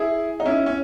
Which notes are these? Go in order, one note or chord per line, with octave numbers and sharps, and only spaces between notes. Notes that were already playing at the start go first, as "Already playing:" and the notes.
Already playing: E4 G#4
D#4
C#4 E4
C#4